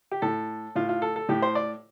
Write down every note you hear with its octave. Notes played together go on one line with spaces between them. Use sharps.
G4
A2 A4
A2 F4
F4
A4
A4
A2 G4
C5
D5